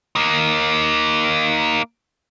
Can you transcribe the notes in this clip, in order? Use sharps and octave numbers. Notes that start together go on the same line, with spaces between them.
A#3 D#4